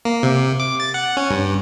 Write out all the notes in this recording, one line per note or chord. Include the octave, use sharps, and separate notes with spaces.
A#3
C3
D6
A6
F#5
C#4
G2